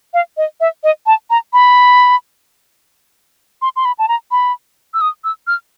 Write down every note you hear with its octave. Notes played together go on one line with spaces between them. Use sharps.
F5
D#5
E5
D#5
A5
A#5
B5
C6
C6
B5
A5
A#5
B5
E6
D#6
E6
F6